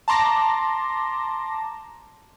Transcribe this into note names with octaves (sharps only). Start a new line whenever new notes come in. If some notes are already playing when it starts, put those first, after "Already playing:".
A5 A#5 C6 D6 A#6